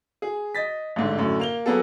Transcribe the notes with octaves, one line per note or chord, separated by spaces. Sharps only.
G#4
D#5 A6 B6
A1 G#2 D3
F#2 A2 D3
A#3 F7 G7
F#3 A#3 B3 G#4 A4